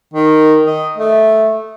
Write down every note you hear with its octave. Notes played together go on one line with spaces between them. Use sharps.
D#3
D#5
A3